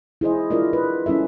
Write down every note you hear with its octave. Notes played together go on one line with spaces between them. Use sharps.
E4 G#4 C5 D#5
D4 E4 F4 A#4 D5 D#5
B4
G3 C#4 E4 A4 E5